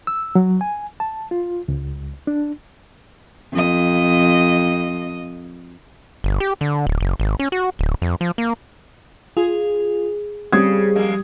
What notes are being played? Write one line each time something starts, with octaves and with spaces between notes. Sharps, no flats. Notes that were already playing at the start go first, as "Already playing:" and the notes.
E6
F#3
G#5
A5
F4
C#2
D4
F2 D#5
G1
G4
D3
D1
F#1
G#1
C#4
F#4
D1
F2
F3
A#3
F4 G#4
C#3 G3 C4 C#4 D#6 G#6
F2 G#3 A#3